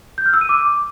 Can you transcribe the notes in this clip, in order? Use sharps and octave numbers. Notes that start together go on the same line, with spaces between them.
G6
F6
E6
D#7
D6